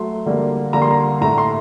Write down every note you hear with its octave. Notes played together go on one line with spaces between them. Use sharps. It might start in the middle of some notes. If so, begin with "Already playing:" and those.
Already playing: F#3 A3 C6
D3 G3 A#3
D3 G3 A#3 A#5
C6
A#5
A2 A3 A#5
C6